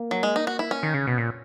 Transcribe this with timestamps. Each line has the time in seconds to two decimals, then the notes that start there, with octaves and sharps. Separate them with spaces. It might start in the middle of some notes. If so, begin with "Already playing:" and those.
Already playing: A#3
0.11 F#3
0.23 G#3
0.36 D#4
0.47 F#4
0.59 E4
0.71 C#4
0.83 D#3
0.94 C#3
1.07 B2
1.18 A#2